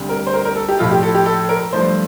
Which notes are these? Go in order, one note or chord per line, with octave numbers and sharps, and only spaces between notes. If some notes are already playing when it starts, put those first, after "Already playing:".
Already playing: D2 C3 G3
A#4
C5
A#4
A#4
A4
G4
A2 F3 A3 F4
G4
A4
G4
A4
A#4
G2 F3 A3 C5